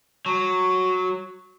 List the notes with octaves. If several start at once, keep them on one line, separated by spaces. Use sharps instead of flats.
F#3